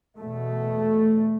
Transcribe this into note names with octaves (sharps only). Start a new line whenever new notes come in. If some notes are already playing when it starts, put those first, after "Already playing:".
E2 B2 A3